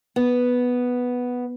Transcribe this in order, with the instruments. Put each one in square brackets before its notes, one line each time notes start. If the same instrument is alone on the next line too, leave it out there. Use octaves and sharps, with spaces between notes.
[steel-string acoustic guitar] B3